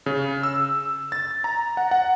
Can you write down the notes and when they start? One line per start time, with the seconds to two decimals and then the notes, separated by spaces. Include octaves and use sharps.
0.06 C#3
0.43 E6
1.12 A6
1.44 A#5
1.77 F#5
1.91 F#5